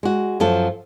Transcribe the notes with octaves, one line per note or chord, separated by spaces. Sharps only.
G#3 F#4
F#2 F3 A4